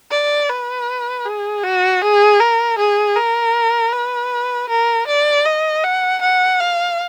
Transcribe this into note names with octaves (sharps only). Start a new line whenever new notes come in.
D5
B4
G#4
F#4
G#4
A#4
G#4
A#4
B4
A#4
D5
D#5
F#5
F#5
F5